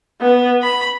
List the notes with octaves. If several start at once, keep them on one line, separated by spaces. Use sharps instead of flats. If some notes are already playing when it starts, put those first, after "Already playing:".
B3
B5